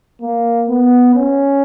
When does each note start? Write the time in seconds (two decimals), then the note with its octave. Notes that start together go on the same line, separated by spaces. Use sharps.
0.22 A#3
0.69 B3
1.15 C#4